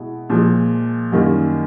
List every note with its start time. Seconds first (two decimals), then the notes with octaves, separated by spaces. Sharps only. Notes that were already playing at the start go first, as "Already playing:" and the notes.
Already playing: B2 G#3 E4
0.30 A#2 F3 G#3
1.12 F#2 D#3 G3 A#3